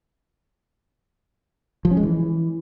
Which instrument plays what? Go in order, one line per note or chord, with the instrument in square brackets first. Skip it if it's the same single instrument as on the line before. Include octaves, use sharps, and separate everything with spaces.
[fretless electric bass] F3
C#4
G#3
E3